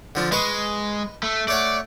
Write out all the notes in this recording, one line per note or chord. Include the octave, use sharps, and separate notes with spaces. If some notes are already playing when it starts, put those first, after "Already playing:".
D3 F3 D4
G#3 B4 D#5 C#6
A3
A3 C#5 D5 F#5